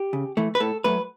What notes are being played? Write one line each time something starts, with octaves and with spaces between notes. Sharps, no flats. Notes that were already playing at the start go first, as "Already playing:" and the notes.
Already playing: G4
C#3
E3 A3
B4
A2 A4
F#3 A3 B4